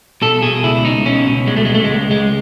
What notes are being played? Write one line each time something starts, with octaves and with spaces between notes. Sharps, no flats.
B2 A4
B2 G#4
C#2 E4
C#2 D#4
B2 C#4
B2
C#2 G#3
A3
C#2 G#3
A3
G#3
C#2
C#2 G#3